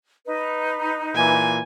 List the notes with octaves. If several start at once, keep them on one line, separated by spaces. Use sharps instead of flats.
D#4 B4
A#2 E3 G#5